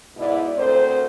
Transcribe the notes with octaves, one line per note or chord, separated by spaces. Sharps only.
G#2 B2 E4 D5
D2 C4 A4 A#4 C5